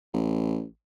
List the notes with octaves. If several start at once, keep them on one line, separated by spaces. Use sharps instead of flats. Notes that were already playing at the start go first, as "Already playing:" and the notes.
A1